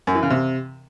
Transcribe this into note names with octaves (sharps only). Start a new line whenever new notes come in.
F#2
E3
C#3
C3